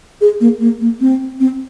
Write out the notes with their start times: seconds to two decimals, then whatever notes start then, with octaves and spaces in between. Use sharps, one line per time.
0.21 G#4
0.41 A#3
0.60 A#3
0.81 A#3
1.01 C4
1.40 C4